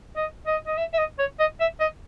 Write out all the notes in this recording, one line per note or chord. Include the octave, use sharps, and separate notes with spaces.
D#5
D#5
D#5
E5
E5
D#5
C#5
D#5
E5
D#5